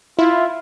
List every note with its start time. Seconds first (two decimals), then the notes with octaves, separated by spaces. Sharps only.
0.18 E4 F4